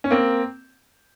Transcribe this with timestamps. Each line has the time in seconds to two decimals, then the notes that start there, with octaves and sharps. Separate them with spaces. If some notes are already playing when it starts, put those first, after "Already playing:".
0.04 C#4
0.11 A#3 C4